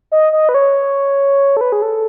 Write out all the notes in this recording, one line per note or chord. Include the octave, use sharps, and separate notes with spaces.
D#5
D#5
B4
C#5
A4
B4
G#4
A4